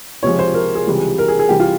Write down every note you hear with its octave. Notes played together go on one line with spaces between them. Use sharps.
C#2 C3 F3 G#3 C#5
C5
A#4
G#4
C#2 C3 E3 G3
A#4
G#4
G#4
C2 C3 E3 G4
F4